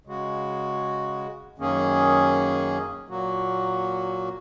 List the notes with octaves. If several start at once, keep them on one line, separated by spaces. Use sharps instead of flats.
C#3 G#3 F#4
F#2 D#3 A#3 C#4 G#4
A#2 F#3 A#3 F#4